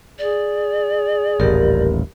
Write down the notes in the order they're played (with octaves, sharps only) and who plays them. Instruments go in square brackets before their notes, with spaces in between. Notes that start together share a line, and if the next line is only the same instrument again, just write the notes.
[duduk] G#4 [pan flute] D5
[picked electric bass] D#1 A1 [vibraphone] G4 A#4